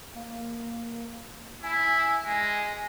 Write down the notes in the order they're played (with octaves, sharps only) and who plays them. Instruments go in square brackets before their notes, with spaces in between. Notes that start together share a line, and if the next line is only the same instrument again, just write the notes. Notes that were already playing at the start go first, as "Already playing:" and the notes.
[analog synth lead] A#3
[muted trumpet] E4 [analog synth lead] G#5
[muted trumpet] G#3